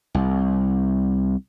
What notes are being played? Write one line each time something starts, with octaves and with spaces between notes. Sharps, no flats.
C2